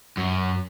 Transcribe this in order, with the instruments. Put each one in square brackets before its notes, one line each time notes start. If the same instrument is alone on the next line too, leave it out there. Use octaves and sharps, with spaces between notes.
[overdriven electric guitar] F#2